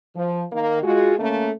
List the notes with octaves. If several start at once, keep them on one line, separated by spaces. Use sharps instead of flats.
F3
D#3 A#3
G#3 F4 F#4
C#3 A3 A#3